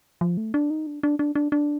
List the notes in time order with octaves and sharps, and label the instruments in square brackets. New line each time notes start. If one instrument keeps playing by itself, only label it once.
[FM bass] F3
A3
D4
D#4
D4
D4
D4
D4
D4